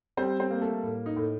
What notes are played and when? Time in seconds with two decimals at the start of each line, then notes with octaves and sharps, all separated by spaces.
0.17 G3 C4 C5
0.39 C4 C5
0.51 A#3
0.61 A3 A4
0.83 A2
1.06 D#4
1.16 A2